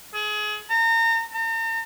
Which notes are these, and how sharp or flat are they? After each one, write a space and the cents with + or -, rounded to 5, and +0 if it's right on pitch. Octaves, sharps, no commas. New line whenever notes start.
G#4 +25
A#5 -35
A#5 -45